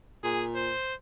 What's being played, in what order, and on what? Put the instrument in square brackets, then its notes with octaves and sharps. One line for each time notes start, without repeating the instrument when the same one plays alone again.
[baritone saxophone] A#2 [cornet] G#4
[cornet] C5